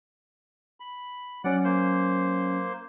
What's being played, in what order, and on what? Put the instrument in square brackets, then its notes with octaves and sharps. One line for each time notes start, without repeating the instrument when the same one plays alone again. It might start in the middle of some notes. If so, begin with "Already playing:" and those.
[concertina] B5
[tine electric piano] F#3 C#4 [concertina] D5 F#5
[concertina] A#3 C5